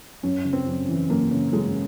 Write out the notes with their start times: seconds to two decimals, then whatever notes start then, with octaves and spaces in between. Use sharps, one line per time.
0.23 F#2 C#4
0.45 C#3
0.53 C4
0.66 F#2
0.88 E3
1.09 F#2 A#3
1.31 C#3
1.52 F#2 G#3